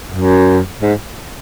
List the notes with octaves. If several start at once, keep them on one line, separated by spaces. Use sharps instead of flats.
F#2
G#2